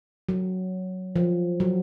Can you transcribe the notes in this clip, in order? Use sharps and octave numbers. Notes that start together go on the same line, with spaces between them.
F#3
F3
F#3